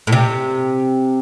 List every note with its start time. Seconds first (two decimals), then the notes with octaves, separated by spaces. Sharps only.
0.07 A2
0.12 C3